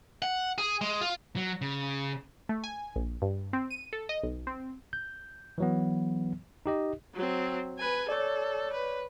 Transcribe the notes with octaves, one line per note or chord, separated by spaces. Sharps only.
F#5
G#4
G#3
F4
F#3
C#3
A3
G#5
A#1
G2
C4
D#7
A4
D#5
B1
C4
G6
E3 F#3 B3
D#4 G4 D#5
F#3 C4
B4 G#5
A4 C#5 D5
B4